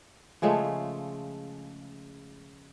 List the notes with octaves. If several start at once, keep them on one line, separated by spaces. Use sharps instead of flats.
C#3 F3 G#3 A3